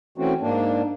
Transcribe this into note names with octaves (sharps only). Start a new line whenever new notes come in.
E3 A3 C4 C#4 F#4
G#2 A#3 D4